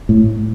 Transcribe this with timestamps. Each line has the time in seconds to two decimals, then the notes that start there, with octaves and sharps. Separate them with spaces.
0.09 A2